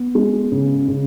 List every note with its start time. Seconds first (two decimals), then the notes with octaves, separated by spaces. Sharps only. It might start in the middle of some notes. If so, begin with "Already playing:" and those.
Already playing: B3
0.15 G#3
0.52 C#3
0.88 C#3